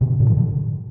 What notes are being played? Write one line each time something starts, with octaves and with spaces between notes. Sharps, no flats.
B2 D3
A2 C#3
F3
B2 D3